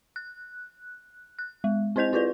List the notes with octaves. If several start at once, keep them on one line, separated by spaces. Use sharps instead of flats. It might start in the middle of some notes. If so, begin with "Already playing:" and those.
F#6
F#6
G#3
C4 E4 C5 D#5 G6 F7
E4 F4 B4 D5